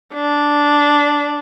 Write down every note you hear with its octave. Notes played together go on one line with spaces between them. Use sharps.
D4